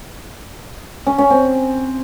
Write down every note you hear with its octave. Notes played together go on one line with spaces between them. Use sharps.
C#4
C#4
C4